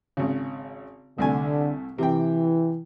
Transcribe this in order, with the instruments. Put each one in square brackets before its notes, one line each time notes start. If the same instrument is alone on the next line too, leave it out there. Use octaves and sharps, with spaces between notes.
[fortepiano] G#1 C#3
[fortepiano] C2 A3 G#5 [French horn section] D3
[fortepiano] C3 G5 [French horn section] E3